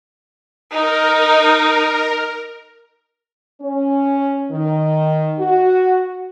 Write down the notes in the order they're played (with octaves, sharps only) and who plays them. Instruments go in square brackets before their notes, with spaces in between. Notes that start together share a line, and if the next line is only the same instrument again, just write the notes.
[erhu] D#4 [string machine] A#4
[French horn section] C#4
D#3
F#4